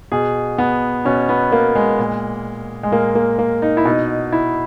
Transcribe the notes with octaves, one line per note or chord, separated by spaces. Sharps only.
B2 G#4
B3
B2 C#4
B3
A#3
G#3
A#2
G#3
A#2 A#3
A#3
A#3
D#4
E4
B2 D#4
E4